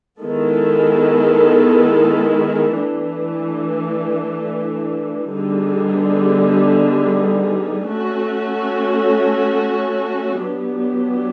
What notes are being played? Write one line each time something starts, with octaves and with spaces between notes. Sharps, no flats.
D#3 G#3 B3 E4 A4
E3 A3 D4
D3 G3 B3 D#4 G#4
A3 C#4 F#4 A4
F#3 B3 D4 G4